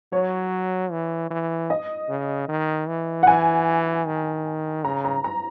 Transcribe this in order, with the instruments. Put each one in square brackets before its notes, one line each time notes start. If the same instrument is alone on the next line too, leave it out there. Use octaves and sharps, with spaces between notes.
[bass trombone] F#3 [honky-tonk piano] C#5
[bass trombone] E3
E3
[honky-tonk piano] D#5
[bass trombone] C#3
D#3
E3
[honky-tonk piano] F#5
[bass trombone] E3 [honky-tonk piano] G#5
[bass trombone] D#3
[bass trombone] C#3 [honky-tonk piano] A#5
[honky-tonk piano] A#5
A#5